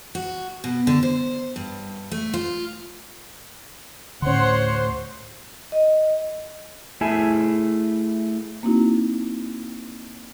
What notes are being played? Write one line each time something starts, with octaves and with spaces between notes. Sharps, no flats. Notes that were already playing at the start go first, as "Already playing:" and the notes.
F#4
B2
D3
C5
G2
A3
F4
D2 A2 D3 C#4 C5 C#5 F#5 C6
D#5
A3 E4 G#4 E5 G#5 A5
A#3 C4 D#4 E4 F#4